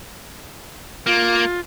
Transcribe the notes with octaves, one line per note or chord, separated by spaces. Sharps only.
A#3 F4